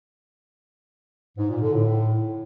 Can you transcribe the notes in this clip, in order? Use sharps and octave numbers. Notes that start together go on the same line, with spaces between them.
G#2
A#2
D3
A2